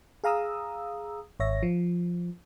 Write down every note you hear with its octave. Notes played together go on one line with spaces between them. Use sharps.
G#4 F5 A#5 D#6 E6
G#1 C#5 E5 A#6
F3